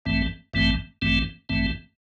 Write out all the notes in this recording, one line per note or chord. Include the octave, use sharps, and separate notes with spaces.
A1 G2 E3 A3 C4
A1 G2 E3 A3 C4
A1 G2 E3 A3 C4
A1 G2 E3 A3 C4